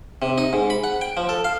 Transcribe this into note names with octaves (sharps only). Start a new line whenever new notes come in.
C3
D#4
G#2
B5
F#5
G5
F3
A4
F5